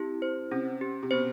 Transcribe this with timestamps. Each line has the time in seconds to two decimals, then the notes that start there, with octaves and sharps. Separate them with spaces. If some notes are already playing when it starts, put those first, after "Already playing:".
Already playing: C3 E4 G4
0.22 C5
0.51 C3 C#4
0.81 G4
1.03 C3
1.11 B2 C5